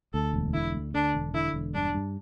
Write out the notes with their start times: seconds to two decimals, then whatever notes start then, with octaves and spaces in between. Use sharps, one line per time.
0.13 D2 A4
0.34 E1
0.54 D3 E4
0.74 D2
0.94 D3 D4
1.14 E1
1.34 D3 E4
1.54 E1
1.74 G2 D4
1.94 G2